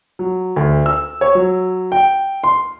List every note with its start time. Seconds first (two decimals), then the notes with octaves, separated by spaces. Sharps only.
0.19 F#3
0.56 D2
0.86 E6
1.21 C#5
1.35 F#3
1.92 G5
2.44 C6